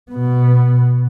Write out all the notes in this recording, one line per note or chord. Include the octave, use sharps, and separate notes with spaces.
B2 B3